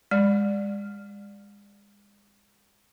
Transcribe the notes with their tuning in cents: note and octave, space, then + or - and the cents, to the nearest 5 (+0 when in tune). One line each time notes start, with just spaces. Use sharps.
G#3 -35 D5 +5